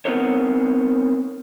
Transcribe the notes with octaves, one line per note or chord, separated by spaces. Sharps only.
B3 C4 D#4 A#4 C5 C#5